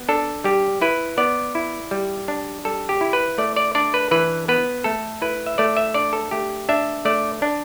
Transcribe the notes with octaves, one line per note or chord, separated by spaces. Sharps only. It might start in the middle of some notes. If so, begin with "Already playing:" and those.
Already playing: B3
D4 A4
G3 G4
E4 B4
B3 D5
E4
G3
D4
G3 A4
G4
E4
B4
A3 D5
D5
D4 D5
B4
E3 B4
B3 B4
A3 A4
E4 B4
E5
A3 D5
E5
D4 D5
A4
A3 G4
D4 E5
A3 D5
D4